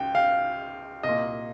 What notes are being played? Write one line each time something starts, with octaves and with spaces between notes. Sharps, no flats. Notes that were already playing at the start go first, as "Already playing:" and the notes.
Already playing: C#2 G5
F5
C2 D#5
A#2